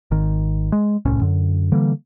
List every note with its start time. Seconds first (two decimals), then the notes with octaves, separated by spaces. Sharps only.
0.11 G#1 D#3
0.72 G#3
1.05 D#1 C2 A2 C#4
1.21 F#2 D3
1.72 D3 E3 G3 A#3